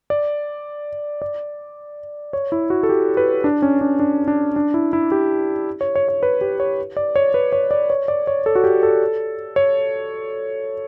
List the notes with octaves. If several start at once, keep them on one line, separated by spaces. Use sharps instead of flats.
D5
D5
C#5
E4
F#4
A4
G4
B4
D4
C#4
D4
D4
D4
D4
E4
E4
G4
C#5
C#5
C#5
B4
G4
C#5
D5
C#5
B4
C#5
D5
C#5
D5
C#5
A4
F#4
G4
A4
C#5